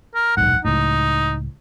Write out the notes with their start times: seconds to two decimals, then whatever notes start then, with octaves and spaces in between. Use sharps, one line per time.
0.15 A#4
0.37 D#1 B1 G#2 F#5
0.65 C#2 A2 D#4